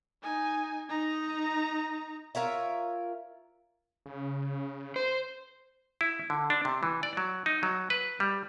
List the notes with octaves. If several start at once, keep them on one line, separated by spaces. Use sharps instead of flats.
D#4 G#5
D#4 A#5
F4 A#4 C#5 E5
C#3
C5
E4
D3
D4
C3
E3
D5
F#3
D#4
F#3
B4
G3